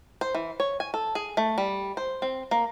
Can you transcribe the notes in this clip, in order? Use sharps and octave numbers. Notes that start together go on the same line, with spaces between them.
C5
E3
C#5
G#5
A4
G#4
A3
G3
C5
C4
A#3